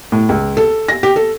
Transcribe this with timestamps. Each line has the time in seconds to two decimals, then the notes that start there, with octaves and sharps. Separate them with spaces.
0.12 A2
0.29 C#2
0.57 A4
0.88 A#6
1.03 G4
1.16 A4